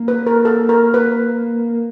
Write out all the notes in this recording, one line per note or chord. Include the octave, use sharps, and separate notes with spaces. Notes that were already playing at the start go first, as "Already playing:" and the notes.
Already playing: A#3
B4
A#4
A4
A#4
B4